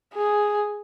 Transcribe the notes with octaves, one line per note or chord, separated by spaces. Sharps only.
G#4